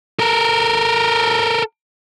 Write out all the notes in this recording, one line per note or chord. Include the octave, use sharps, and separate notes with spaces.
A4 A#4